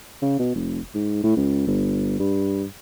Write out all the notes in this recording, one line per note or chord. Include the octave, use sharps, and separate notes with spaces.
C#3
B2
F1
G#2
A2
C#2
G1
G2